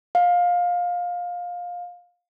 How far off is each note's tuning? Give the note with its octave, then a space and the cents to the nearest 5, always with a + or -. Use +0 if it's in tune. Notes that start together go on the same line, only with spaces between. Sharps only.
F5 +20